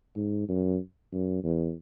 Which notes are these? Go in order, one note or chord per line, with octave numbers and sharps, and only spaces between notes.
G#2
F#2
F#2
E2